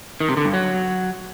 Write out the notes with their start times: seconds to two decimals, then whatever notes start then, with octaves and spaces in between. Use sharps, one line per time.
0.20 D#3
0.29 C3
0.37 D3
0.45 G2
0.53 F#3